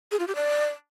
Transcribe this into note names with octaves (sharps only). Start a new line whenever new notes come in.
G#4
F4
G4
D5